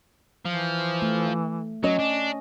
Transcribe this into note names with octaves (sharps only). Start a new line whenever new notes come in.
E3 F3
A3
F#3 C#4 D#5
D4